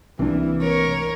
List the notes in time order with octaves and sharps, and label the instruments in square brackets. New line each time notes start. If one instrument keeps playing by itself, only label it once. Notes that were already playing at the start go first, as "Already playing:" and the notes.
[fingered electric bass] C2 D4 [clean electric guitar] C3 A#3 [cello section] E3
[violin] A#4 [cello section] C#5